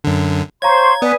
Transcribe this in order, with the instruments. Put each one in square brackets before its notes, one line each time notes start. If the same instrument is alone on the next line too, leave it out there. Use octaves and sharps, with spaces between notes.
[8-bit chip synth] F#2 D3
[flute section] C5 C6 C#6 [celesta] C#5 F5 A#5 [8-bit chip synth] G#6
[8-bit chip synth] B3 [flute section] B4 G#5 D#6 [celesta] D5